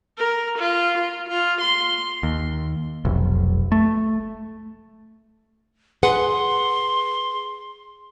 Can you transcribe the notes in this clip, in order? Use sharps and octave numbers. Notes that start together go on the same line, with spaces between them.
A#4
F4
F4
F4
C6
D#2
F1 B1
A3
G#4 B4 F#5 C6